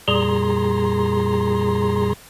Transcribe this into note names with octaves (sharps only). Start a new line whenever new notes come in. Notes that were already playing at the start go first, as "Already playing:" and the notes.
F2 A#2 G3 G#4 A#5 C6